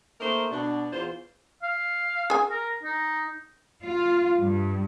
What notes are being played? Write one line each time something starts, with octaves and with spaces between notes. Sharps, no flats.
A3 A#3 D#4 A#4 C5 E5
B2 D4
E2 F4 C5
F5
G#4 G#5
A#4
D#4
F4
G2